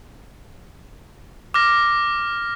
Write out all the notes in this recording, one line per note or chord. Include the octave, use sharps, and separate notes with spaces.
D6 F6 A#6